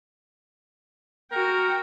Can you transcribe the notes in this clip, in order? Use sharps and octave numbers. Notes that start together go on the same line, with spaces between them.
F#4 A#4 G5